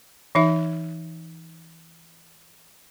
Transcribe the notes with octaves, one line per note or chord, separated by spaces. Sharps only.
E3 D#4 E5